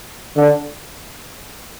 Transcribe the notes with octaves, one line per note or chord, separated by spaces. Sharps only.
D3